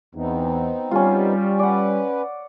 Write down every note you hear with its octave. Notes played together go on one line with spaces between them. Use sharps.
E2 B3 C4 D#4
G3 C#4 F4
C#4 B4 D5 F#5